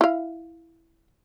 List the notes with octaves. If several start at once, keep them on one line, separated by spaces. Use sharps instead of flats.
E4 F5